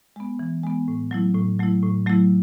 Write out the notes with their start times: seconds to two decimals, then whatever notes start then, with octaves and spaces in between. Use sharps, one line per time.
0.16 G#3 B3
0.39 E3
0.63 G#3 B3
0.88 A2
1.11 F#3 A3 E4
1.35 A2
1.59 F#3 A3 E4
1.82 A2
2.06 F#3 A3 E4